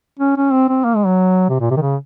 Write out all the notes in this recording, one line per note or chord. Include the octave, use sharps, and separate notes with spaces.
C#4
C#4
C4
C4
A#3
G#3
F#3
C3
A#2
C3
D#3
C#3